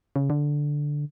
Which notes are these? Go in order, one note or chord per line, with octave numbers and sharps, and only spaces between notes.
C#3
D3